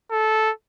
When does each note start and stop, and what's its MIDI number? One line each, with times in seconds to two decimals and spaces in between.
0.11 0.51 69